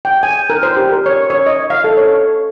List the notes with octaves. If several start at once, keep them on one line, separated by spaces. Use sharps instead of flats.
G5
G#5
A#4
C5
G4
A#4
C#5
C#5
D#5
F5
A4
C#5